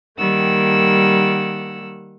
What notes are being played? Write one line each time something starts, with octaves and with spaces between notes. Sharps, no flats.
D#3 G3 A#3 F#5 E6